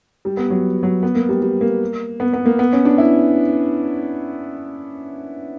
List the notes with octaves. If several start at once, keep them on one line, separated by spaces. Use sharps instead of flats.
G3
B3
F#3
F#3
B3
A#3
G3
G3
A#3
B3
B3
A#3
B3
C#4
D4
E4